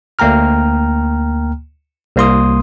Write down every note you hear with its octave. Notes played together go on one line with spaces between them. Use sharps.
D2 A#3 G5 A#5 F6
C2 A#3 C6 D#6